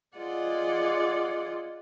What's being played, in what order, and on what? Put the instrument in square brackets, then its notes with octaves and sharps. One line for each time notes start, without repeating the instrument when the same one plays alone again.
[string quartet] F4 G#4 D5 D#5 F#5